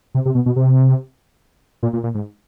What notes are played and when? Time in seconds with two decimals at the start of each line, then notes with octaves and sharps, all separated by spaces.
0.14 C3
0.25 C3
0.35 B2
0.46 B2
0.56 C3
1.83 A#2
1.93 A#2
2.03 A#2
2.15 G#2